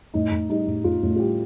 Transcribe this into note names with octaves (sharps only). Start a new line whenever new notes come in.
A2 D#4
A2
G3 D#4
A2
A2 F4
A2
F4
G3 G4